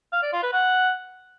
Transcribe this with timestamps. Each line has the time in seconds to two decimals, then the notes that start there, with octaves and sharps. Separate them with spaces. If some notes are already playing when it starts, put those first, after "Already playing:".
0.12 F5
0.23 D5
0.33 F4
0.43 B4
0.53 F#5